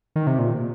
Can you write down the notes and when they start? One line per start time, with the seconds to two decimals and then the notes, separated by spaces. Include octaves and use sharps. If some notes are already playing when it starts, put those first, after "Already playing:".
0.16 D#3
0.27 C3
0.39 A#2